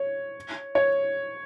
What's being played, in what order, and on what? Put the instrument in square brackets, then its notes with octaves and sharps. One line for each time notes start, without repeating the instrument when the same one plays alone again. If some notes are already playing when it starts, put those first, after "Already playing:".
Already playing: [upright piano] C#5
C#5